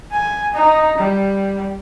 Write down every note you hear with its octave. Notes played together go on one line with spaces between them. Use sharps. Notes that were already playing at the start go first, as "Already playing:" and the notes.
G#5
D#4
G3